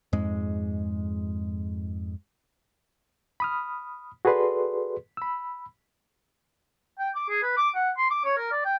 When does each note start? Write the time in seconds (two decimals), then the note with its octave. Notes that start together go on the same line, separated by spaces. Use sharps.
0.13 F2 G#2 G#3
3.40 B5 D#6 F6
4.25 F#4 G#4 A4 B4 D5 C6
5.17 B5 E6
6.99 G5
7.15 D6
7.29 G#4
7.43 B4
7.57 D6
7.75 F#5
7.98 C6
8.10 D6
8.25 C#5
8.37 A#4
8.52 D5
8.65 G5